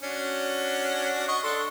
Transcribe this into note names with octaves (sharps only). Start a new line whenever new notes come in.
C#4 D4 F#4
D#5 C#6
D4 A4 C6